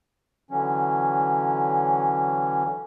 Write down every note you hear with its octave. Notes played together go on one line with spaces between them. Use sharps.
D3 E3 F#3 C#4